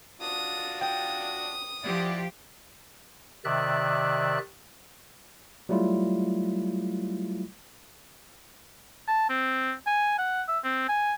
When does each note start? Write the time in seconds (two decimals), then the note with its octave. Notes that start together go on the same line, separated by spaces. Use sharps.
0.21 D4 F4 F#4 D#6
0.81 G5 D#6
1.84 F3 E4 G4 D5 F#5
3.45 C3 D#3 D5 E5 F#6
5.69 F#3 G3 A3 E4 F4
9.08 A5
9.30 C4
9.87 G#5
10.19 F#5
10.48 E5
10.64 C4
10.89 G#5